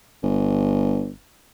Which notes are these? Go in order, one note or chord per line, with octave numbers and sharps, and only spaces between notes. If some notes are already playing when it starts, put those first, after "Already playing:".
G1